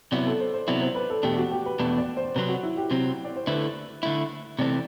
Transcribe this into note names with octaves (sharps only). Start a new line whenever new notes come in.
C3 F#3 B3 E4 D5
A4
C5
C5
C3 F#3 B3 E4 D5
C5
B4
A4
E2 B2 A3 D4 G4
F#4
G4
B4
E2 B2 A3 D4 B4
D5
C5
C3 F#3 C4 B4
F#4
E4
G4
C3 F#3 C4
D5
C5
D3 A3 E4 B4
D3 A3 E4
C3 E3 A3 C4 D5